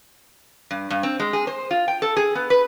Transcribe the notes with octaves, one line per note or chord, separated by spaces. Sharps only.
G2
G2
C4
G#3
G#4
C5
F4
G5
A4
G#4
B3
B4